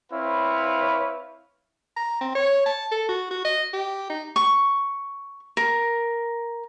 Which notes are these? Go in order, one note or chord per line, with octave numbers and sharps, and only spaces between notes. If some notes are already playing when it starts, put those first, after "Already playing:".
C4 E4 B4 C#5 F5
A#5
C4
C#5
A5
A4
F#4
F#4
D#5
G4
D#4
C#6
A#4